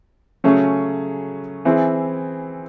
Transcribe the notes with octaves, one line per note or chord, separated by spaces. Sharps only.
C#3 F#3 A3 C#4 G#4
E3 C4 E4 G#4